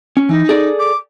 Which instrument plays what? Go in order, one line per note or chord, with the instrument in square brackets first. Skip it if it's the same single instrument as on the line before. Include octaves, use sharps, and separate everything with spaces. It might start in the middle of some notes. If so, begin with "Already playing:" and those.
[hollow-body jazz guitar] C#4
[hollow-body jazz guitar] E3 [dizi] D#4
[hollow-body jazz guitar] G#4 A4 D5
[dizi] D6